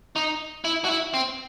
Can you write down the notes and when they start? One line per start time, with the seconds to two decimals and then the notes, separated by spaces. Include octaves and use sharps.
0.16 D#4
0.64 E4
0.84 F#4
0.88 E4
1.14 C4